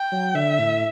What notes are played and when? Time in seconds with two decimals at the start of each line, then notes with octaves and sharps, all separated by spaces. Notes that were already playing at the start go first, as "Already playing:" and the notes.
Already playing: G5
0.12 F#3
0.35 D3 E5
0.59 A2